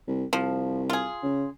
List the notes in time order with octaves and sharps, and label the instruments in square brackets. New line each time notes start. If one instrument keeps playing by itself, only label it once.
[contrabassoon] C2
[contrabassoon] C2 [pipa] F3
[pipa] F4 G#4
[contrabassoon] C#3